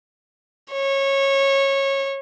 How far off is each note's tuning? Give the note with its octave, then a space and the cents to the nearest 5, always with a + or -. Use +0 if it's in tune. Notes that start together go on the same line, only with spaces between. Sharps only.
C#5 -20